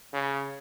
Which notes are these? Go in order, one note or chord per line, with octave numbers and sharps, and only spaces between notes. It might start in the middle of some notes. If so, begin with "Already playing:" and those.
C#3